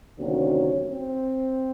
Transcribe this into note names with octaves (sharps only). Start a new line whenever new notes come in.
D2 C3 D#3 F#3 A#3 C#4
C4